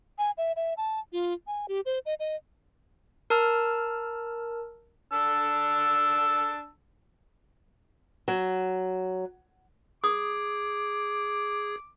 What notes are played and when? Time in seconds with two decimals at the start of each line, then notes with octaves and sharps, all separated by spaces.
0.19 G#5
0.38 E5
0.56 E5
0.77 A5
1.12 F4
1.47 G#5
1.68 G4
1.86 C5
2.06 D#5
2.20 D#5
3.30 A#4 A5 E6 F6
5.12 D4 A5 E6
8.28 F#3
10.04 G#4 D6 D#6 G#6